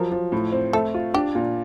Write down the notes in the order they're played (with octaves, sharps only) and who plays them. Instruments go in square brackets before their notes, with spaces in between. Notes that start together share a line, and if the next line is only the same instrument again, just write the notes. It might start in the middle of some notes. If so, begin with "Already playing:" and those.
Already playing: [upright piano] F3 F#3 [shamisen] A#4
[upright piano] F3
A2
C4
[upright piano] A3 [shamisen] A4
[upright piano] F4
[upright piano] D4 [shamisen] G4
[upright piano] A#2